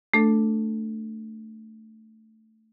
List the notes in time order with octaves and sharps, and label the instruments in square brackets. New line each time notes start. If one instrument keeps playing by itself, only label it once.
[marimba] A3 D4 A4